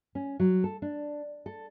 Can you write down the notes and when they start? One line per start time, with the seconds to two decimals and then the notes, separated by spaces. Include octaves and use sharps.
0.15 C#4
0.40 F#3
0.64 A4
0.82 D4
1.46 A4